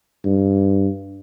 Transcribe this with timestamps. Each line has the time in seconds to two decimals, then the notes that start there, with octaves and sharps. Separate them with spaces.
0.24 G2